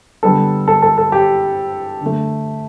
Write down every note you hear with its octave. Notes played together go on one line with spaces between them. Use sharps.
D3 G3 B3 A4
A4
A4
A4
G4
D3
A3